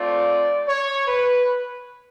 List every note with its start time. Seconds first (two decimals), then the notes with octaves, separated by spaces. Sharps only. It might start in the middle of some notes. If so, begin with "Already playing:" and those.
Already playing: A3 C4 F4 D5
0.67 C#5
1.07 B4